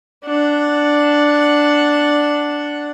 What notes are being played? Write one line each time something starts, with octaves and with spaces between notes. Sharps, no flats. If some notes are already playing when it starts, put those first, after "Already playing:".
D4 F#5